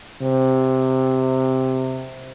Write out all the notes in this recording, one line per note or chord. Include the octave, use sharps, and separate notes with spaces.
C3